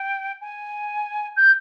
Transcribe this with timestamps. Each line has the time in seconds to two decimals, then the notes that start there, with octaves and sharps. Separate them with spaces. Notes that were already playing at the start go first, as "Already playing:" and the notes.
Already playing: G5
0.41 G#5
1.37 G6